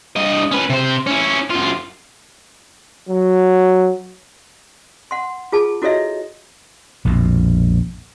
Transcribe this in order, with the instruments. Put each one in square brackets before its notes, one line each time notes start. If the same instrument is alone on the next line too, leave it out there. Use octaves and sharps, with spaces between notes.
[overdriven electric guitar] G2 D#5
C#4 B4
C3 C5
C#4 E4
F#2 F4
[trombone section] F#3
[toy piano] F#5 C6
F4 G#4 A5
E4 F#4 A4 C#5 D#5 E5
[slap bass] A#1 F2 B2